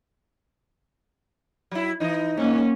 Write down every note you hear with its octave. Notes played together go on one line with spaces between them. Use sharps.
F#3 E4
E3 D#4
G#2 G#3 A#3 C#4